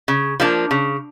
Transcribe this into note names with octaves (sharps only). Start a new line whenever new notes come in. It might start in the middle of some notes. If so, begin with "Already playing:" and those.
C#3
F3 A#3 D4
C#3